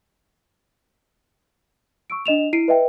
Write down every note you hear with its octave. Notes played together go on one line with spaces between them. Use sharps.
C#6 E6 D7
D4 D#5 E7 F7
E4 C7 D7 D#7
B4 D#5 E5 G5